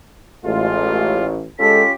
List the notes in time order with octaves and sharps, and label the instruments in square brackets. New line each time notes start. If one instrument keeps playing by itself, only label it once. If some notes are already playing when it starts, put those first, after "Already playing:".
[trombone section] A1 [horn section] G#3 A3 F4
[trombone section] G#3 A4 [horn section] C#4 F4 G4 [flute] B6